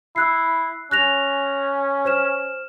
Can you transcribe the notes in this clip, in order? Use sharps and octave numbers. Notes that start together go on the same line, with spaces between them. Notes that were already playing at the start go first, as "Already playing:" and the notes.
E4 E6 F#6 C7
C#4 F#6 A#6 F7
C5 F6 E7